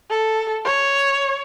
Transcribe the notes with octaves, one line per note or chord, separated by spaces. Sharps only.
A4
C#5